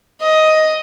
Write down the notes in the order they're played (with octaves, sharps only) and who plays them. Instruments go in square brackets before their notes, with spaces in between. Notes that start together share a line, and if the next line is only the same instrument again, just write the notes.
[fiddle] D#5